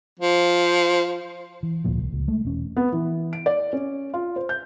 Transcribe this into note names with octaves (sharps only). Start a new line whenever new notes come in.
F3
E3
G#1 D2 A#2 F3
C2
C#2
G#3 A3
E1 C#4
B3
E3
D7
D5
C#4
F4
C5
G6